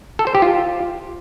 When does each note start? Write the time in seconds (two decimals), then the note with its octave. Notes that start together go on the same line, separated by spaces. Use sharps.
0.19 A4
0.27 C5
0.35 G4
0.42 F4